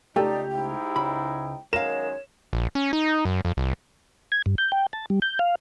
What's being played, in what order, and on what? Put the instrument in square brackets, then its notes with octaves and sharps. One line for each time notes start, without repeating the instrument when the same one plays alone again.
[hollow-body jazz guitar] C#2 A3 A4 [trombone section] D#4 [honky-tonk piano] G4 [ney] D5
[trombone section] G#2 D#4 E4 [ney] G5
[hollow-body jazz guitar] C#2 B5
[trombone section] F#2 D#3 G#3 [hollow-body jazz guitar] A#4 F5 [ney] C#5 [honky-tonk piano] E7
[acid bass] A#1
C#4
D#4
F#2
F2
C2
[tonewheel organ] G#6
G2
G6
G5
A5
G3
G6
F5